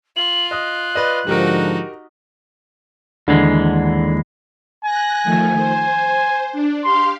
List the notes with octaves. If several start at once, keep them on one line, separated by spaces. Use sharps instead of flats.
F4 F#7
D#5 D#6 F#6
B4 D5 D#5
G#2 D3 F3 D#4 F#4 G4 A#4
D#2 D3 E3 G#3
G#5 F#6 A#6
D#3 F3 A3
C5
D4
G4 F5 C6